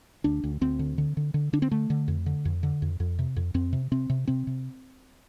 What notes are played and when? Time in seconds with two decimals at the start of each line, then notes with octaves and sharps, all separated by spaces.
0.24 D2 D4
0.44 D2
0.61 D2 C4
0.79 D3
0.98 D3
1.17 D3
1.34 D3
1.53 D3 D4
1.62 C4
1.71 D3 A3
1.90 D3
2.08 F2
2.26 D3
2.45 F2
2.63 D3
2.82 F2
3.00 F2
3.19 C3
3.36 F2
3.54 F2 C4
3.73 C3
3.91 C3 C4
4.10 C3
4.27 C3 C4
4.47 C3